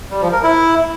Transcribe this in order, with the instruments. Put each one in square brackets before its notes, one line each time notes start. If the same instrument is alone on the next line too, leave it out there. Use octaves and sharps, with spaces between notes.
[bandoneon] G3
F3
A#4
E4